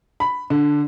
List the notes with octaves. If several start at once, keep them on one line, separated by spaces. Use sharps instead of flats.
B5
D3